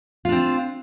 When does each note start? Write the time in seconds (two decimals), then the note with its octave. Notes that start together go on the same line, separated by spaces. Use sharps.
0.25 F4
0.29 D4
0.32 C4